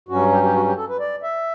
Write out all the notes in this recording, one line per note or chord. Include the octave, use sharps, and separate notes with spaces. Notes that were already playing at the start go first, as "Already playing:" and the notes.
G2 F#3 C#4 F#4
G4
G4
F#4
G4
A4
B4
D5
E5